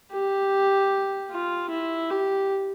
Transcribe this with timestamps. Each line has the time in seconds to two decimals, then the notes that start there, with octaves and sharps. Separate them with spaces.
0.12 G4
1.31 F4
1.70 E4
2.10 G4